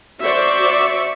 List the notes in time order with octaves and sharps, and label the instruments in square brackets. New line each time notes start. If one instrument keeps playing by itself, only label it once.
[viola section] F#4 C5 D5 [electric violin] E5 C#6